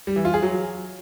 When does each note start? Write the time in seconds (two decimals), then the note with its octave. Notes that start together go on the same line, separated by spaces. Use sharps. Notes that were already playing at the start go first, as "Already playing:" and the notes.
0.07 G3
0.16 E3
0.25 F4
0.34 G#4
0.43 F#3